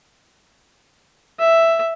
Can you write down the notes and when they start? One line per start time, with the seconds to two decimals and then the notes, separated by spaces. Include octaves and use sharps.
1.40 E5